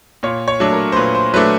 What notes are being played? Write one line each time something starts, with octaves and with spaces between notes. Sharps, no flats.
A#2 C#5
C#5
F#3 A3 D4
A#4
C5
A#2 B4
C5
F#3 A3 D4 B4